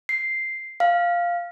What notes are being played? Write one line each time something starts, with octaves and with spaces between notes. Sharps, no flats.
C7
F5